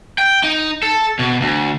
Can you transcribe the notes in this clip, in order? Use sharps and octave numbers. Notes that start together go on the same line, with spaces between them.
G5
D#4
A4
B2
D2